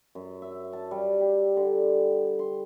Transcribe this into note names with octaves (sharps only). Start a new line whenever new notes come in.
F#2
E5
A5
G3
G4
D3
C6